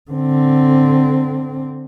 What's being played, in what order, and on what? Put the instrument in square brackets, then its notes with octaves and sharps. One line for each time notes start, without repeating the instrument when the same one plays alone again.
[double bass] D3 C4